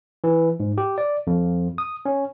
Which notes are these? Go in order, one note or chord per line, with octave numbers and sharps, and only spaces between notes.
E3
G#2
G4
D5
F2
D#6
C#4